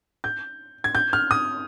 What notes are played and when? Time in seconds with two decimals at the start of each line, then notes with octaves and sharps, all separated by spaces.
0.24 G6
0.84 G#6
0.95 G6
1.13 F6
1.31 D#6